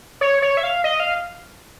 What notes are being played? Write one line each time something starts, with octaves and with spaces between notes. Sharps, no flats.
C#5
C#5
E5
F5
D#5
F5